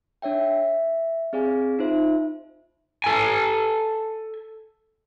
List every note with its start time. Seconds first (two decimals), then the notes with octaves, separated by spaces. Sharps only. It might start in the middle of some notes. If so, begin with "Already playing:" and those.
0.22 D4 C#5 E5 G5
0.41 E5
1.33 C4 G#4 D5 F5 G#5
1.79 D#4 F4 C5 E5
3.04 A4 G#5